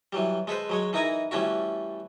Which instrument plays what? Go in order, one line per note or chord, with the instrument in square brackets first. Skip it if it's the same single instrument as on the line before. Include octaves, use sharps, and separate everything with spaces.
[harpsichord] E3 F#3 G3
G#3 A4 B4 C5
F#3 G#3 C#5
E3 D#4 E4 A#4 G#5 A#5
E3 G3 A3 C#4 E4 F#4